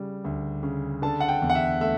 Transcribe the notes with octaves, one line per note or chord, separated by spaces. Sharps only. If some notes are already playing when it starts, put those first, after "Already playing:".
Already playing: C#3 G3
D2
C#3
D3 A5
F#5
G5
E2
F#5
E5
A3 E5